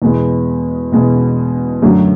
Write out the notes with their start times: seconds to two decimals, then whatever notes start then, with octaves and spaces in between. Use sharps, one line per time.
0.02 E2 B2 G#3 B3
0.92 E2 B2 G#3 B3
1.82 F#2 D3 F#3 A3 D4